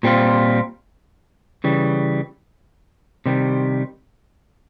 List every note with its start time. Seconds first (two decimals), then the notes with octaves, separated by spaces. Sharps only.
0.03 A#2 G3 C4 F4
1.64 C#3 E3 G3
3.26 C3 D#3 G3